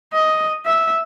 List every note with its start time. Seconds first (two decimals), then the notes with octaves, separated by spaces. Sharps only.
0.13 D#5
0.66 E5